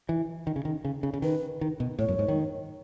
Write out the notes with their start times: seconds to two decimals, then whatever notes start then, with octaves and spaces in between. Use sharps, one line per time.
0.09 E3
0.47 D#3
0.56 C#3
0.65 D#3
0.85 C#3
1.03 C#3
1.14 C#3
1.22 D#3 B4
1.61 D#3
1.80 B2
1.99 A2 C#5
2.08 F#2
2.19 G#2
2.28 D#3